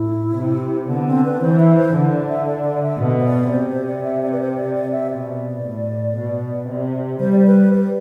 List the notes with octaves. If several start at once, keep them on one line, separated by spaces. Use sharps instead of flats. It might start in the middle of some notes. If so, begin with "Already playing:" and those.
Already playing: A2 E4
C3
D3 B3
C4
B4
E3 C5
E5
C5
D3
D5
E5
D5
D5
E5
B2
C5
D5
C3 C5
C5
D5
E5
D5
B4
C5
D5
D5
E5
B2 D5
A2
B2
C3
G3 C5
D5
C5
B4
B4